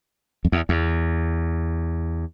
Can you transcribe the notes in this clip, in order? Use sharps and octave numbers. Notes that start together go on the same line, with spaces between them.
F2
E2
E2